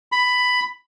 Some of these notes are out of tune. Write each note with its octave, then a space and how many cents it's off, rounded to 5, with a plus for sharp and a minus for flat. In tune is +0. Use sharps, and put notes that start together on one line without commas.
B5 +10